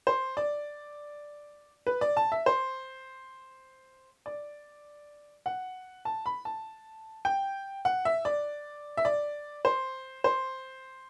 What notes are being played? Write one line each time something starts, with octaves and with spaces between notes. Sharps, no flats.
C5
D5
B4
D5
A5
E5
C5
D5
F#5
A5
B5
A5
G5
F#5
E5
D5
E5
D5
C5
C5